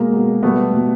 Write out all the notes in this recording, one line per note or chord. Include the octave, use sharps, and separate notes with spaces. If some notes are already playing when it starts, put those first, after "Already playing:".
Already playing: B2 G#3 A#3
B2 G#3
B2 G3 A3 B3
B2 G3